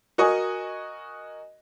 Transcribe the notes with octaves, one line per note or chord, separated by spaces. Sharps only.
F#4 A#4 D#5 G#5 C#6 D#6